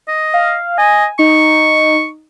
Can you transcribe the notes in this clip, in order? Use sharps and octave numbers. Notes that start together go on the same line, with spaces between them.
D#5
F5
D#5 G#5
D#4 C#6